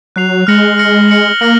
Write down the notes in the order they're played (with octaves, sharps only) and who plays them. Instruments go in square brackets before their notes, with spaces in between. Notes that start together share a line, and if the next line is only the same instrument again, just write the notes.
[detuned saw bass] F#3 [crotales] F#6 C7 F7
[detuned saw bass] G#3 [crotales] F6 A#6 C#7 F#7
[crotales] F6 A#6 C#7 F#7
F6 A#6 C#7 F#7
[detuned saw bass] A#3 [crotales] F6 A#6 C#7 F#7